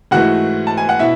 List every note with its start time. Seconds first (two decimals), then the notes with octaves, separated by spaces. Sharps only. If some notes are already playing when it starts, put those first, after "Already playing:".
0.11 G#2 E3 A3 F#4 F#5
0.67 A5
0.78 G#5
0.89 F#5
0.99 B2 E4 E5